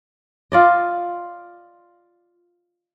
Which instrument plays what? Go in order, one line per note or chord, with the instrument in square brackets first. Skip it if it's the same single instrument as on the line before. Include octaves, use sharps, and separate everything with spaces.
[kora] F4 D5 D#5